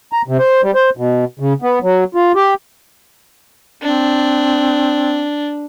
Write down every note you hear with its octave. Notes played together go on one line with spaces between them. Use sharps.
A#5
C3
C5
G3
C5
B2
C#3
B3
F#3
F4
G4
C4 D4